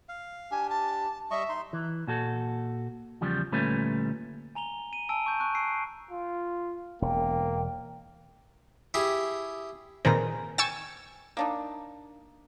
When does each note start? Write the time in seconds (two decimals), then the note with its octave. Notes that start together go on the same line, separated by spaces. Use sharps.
0.09 F5
0.51 D4 G4 G#5
0.70 A5
1.31 G3 D#5 E5 C#6
1.49 D#4 C6
1.73 E3
2.07 A#2 F#4 A4
3.21 E2 C#3 F3 G3
3.52 D2 A#2 G3 A3 C#4 B4
4.55 G#5 A#5 F7 G7
4.93 D#7
5.09 G#5 A5 E6 D7
5.26 C#6 G6
5.40 C#6 F#6
5.55 E6 C7 D7
6.11 F4
7.02 E1 A#3 G5
8.94 E4 G4 G#4
10.05 A#2 D#3 C4 G#4 B4 A#5
10.58 G5 G#5 C#6 E6 A6
11.37 A#3 D4 D#4